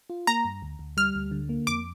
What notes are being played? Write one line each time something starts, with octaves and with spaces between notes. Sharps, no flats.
F4
A#3 A#5
G2
D2
D2
G3 F6
D2
D3
A#3
F2 D6